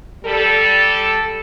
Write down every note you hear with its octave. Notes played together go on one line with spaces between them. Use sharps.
G3 A4